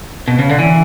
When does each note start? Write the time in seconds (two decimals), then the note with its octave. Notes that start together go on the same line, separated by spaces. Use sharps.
0.28 B2
0.39 C#3
0.49 D3
0.59 E3